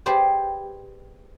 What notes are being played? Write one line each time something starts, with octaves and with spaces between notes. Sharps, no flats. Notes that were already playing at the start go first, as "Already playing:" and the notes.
G4 G#4 B4 C5 D5